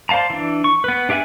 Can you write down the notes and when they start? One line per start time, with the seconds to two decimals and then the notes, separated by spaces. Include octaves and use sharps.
0.09 C5 D5 F5 A5 A#5
0.30 E3 D4
0.64 C#6
0.84 B3 B4
1.09 D4 G4 E5 F#5 G#5